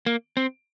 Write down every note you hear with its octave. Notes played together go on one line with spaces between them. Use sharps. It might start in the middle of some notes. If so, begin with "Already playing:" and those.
A#3
C4